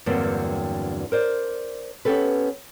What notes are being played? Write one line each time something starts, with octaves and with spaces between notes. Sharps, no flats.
E2 G2 D3 F#3 A#3 C4
A#4 C5 D5
B3 C#4 G4 A4 B4